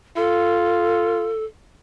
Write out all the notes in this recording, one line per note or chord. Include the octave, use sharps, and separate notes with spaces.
F4 A4